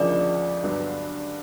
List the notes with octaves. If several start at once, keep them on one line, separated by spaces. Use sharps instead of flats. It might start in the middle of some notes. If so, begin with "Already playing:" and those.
Already playing: D2 C#3 F3 A#3 D#4 D5
G2 D3 F#3 B3 D4